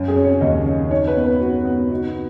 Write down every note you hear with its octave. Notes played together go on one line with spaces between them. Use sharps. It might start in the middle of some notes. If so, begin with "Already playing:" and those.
Already playing: F#2 C#4
G#4
C#4
C#5
D#2 D#5
C#4
D#4 C#5
B4
B3
B4
B3 F#4
B3
D#4 F#4